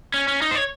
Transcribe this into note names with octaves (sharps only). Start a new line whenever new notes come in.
C#4
C#4
D#4
C5
C#5